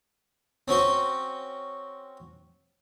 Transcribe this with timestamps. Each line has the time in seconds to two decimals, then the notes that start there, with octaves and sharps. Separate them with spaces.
0.68 C4 C#4 F#4 C5